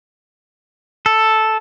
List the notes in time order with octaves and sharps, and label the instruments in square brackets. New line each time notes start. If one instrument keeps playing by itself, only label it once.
[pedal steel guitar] A4